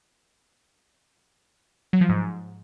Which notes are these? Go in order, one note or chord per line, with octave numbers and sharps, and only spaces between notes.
F#3
F3
G#2